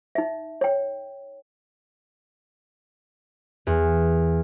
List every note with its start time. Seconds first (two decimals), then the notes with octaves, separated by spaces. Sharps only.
0.15 D#4 E5
0.61 C#5 G5
3.67 E2